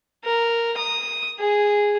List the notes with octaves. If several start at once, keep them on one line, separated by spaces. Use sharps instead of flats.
A#4
D#6
G#4